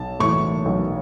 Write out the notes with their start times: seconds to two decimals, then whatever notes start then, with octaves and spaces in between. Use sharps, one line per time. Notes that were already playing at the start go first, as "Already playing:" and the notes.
Already playing: B1 A5
0.19 A2 E3 C#6
0.65 B1